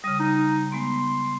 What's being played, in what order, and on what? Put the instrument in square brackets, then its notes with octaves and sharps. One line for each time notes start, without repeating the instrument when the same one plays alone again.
[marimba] C#3 G3 [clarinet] D#6
[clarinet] D#4
[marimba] G#3 B3 [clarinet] C6